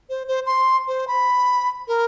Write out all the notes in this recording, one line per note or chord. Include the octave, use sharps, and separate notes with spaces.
C5
C5
C6
C5
B5
A#4